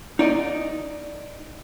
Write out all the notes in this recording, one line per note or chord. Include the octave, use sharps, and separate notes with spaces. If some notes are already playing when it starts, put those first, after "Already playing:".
D#4 D5 D#5